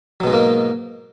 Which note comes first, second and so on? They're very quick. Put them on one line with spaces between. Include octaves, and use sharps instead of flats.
F#3 B2 G#3 G#2 A#3